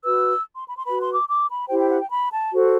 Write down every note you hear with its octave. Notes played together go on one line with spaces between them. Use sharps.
F#4 B4 E6
C6
B5
C6
F#4 B4 B5
C6
D6
D6
B5
E4 G4 C5 G5
G5
F#5
G5
B5
A5
F#4 A4 C5